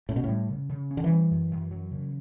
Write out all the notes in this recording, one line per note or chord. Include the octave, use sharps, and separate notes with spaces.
A2 C#4
B2
A2
G3
C#3
C#3
C#4
D3
E3
G3
F#2
F#2
F#3
C#3